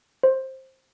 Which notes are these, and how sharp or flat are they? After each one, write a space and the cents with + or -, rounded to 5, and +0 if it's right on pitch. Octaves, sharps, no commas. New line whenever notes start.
C5 +15